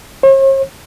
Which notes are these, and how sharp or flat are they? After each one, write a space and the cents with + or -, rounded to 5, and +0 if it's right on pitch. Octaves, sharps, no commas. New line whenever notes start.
C#5 -45